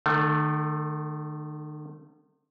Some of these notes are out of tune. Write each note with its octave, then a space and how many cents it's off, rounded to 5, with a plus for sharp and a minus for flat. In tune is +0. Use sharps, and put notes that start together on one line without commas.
D#3 -45 A3 +0